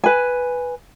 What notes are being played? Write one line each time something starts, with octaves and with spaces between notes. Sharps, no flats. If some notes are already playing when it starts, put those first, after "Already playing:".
B4 G#5